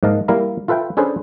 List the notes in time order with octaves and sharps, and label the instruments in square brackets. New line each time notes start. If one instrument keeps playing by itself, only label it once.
[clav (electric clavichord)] G#2 A#3 D#5 F5 A5
G3 A#3 E4 A#4 F5 A#5
F4 A4 B4 E5 G5
C#4 D4 G#4 A4 B4 C5